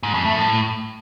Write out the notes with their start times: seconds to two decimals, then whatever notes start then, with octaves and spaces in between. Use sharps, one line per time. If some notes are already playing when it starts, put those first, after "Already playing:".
0.03 G#2
0.14 F2
0.25 A3
0.36 A2